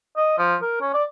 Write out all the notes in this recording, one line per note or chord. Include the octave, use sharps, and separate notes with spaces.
D#5
F3
A#4
C#4
D5